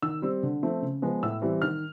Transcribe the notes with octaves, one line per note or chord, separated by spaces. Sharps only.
D#3 E6
G3 C4
D3
F3 A3 C4
C#3
F3 G#3 B3
A2 E6
E3 G3 C4
D#3 F6